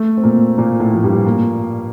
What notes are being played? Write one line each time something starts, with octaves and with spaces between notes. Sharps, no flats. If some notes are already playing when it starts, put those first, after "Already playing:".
Already playing: A3
C4
A#2 A#3
A#2 A#3
A2 A3
F3
G2 G3
A#2 A#3